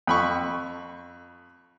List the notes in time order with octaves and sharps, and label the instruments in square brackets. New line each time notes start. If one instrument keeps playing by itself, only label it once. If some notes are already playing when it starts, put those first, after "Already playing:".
[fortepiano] F2 B5 C#6